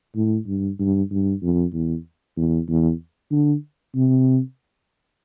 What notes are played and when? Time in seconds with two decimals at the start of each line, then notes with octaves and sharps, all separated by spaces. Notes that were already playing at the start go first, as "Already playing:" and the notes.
0.15 A2
0.47 G2
0.80 G2
1.11 G2
1.42 F2
1.73 E2
2.37 E2
2.69 E2
3.31 D3
3.95 C3